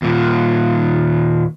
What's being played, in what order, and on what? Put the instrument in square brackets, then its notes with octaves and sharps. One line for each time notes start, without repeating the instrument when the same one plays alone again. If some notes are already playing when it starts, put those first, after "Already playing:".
[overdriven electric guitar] D#2 A#2